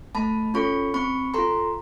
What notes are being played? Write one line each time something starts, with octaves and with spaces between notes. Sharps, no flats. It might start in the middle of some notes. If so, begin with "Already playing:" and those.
A3 A5 B5
C#4 F4 A4 B5 C#6
C4 B5 C#6
F4 A4 A#5 C6